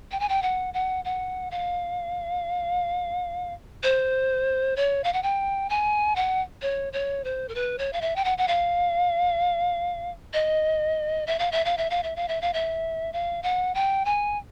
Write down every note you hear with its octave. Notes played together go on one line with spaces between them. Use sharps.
G5
G#5
G5
F#5
F#5
F#5
F5
C5
C#5
F5
F#5
G5
G#5
F#5
C#5
C#5
C5
A#4
B4
C#5
F5
E5
G5
F#5
F#5
F5
D#5
E5
F5
E5
F5
E5
F5
E5
F5
E5
F5
E5
F5
F#5
G5
G#5